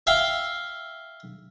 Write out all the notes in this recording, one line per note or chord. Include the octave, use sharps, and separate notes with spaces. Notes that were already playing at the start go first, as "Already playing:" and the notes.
E5 F5 G5